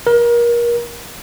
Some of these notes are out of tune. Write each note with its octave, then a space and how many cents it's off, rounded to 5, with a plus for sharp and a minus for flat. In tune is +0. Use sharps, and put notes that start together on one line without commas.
A#4 +30